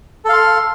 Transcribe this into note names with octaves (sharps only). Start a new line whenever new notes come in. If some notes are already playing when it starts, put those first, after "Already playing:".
A4 F5 C6